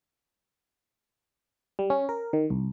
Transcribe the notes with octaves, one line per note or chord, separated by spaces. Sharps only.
G3
C#4
A#4
D#3
C2